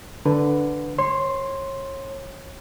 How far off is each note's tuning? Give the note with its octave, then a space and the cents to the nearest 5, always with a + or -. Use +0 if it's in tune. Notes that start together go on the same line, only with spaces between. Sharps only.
D3 +0 B4 +0
C#5 -30 C6 +0